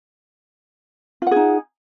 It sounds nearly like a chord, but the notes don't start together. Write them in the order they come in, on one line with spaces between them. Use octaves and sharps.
F4 F#5 G#4 D#4